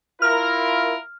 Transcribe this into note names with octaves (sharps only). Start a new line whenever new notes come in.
E4 F4 A#4 F6